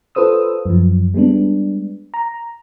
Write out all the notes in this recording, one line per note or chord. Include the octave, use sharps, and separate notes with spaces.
F4 A4 B4 C5 D#6 E6
F#2 F3
G3 G#3 B3 D4
A#5